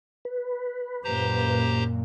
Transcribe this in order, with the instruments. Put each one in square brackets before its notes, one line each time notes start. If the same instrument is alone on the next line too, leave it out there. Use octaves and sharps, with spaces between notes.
[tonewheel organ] B4
[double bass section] F#2 A#2 A#3 [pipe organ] G4 C5 A#5